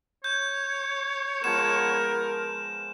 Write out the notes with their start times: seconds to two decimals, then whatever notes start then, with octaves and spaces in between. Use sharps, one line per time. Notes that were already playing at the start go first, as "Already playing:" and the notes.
0.24 C#5 G6
1.44 F3 G#3 B3 A#4 E7